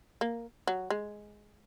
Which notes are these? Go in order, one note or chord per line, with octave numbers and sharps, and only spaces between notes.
A#3
F#3
G#3